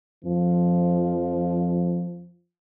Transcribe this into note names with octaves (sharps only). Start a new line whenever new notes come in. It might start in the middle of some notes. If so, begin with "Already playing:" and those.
F2 F3